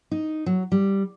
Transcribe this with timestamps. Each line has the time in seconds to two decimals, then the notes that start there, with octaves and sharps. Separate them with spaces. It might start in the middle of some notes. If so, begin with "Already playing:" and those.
0.11 D#4
0.46 F#3
0.72 G3